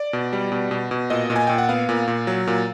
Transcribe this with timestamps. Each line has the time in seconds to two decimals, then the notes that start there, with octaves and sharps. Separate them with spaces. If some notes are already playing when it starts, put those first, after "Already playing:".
Already playing: D5
0.13 B2
0.33 G3
0.52 B2
0.71 B2
0.91 B2
1.10 A#2 D#5
1.30 A#2
1.36 G#5
1.47 A#2 G5
1.58 F#5
1.69 B3 F5
1.89 A#2
2.08 A#2
2.27 F#3
2.47 A#2